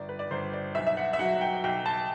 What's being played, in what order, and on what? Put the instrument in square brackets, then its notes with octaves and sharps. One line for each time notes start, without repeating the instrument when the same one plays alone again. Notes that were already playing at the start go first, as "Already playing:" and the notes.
Already playing: [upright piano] G1 D5
B4
D5
G1 C5
D5
B1 E5
E5
F#5
E5
F#3 F#5
G5
B1 G5
A5